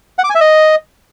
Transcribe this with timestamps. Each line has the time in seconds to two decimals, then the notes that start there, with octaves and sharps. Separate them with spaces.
0.19 F#5
0.24 D6
0.30 G#5
0.35 E5
0.40 D#5